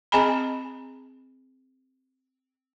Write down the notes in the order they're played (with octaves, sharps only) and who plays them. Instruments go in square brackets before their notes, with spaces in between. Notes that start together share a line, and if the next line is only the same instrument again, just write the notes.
[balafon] C4 G#4 D#5 G#5 A#5 B5